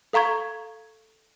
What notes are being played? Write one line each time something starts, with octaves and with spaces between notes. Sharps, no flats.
A4 F5 A#5 C#6 G#6